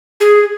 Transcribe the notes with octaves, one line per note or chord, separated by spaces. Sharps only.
G#4